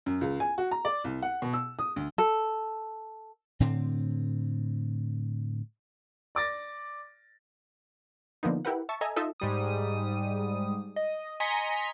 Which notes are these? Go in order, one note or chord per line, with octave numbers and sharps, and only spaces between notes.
F#2
C#2
G#5
F#4
A#5
D5
C2
F#5
B2
E6
D#6
D2
A4
A2 D3 C4
D5 D6 A6 A#6
D3 F3 A#3 B3 D#4
E4 G4 A#4 B4 F#5
E5 A5 C#6
A4 D#5 E5 G#5 A#5
D#4 F4 A4 D#5 E5
G#2 G3 D#6
D#5
D#5 G#5 A#5 C6 B6 C#7